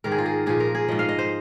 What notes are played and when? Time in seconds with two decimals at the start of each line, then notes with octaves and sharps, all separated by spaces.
0.04 G#2 D#3 A#4
0.12 G#4
0.18 F4
0.26 G#4
0.46 A#2 F3 G#4
0.60 A#4
0.75 G#4
0.88 G#2 F3 D#5
0.99 F5
1.09 D#5
1.19 C5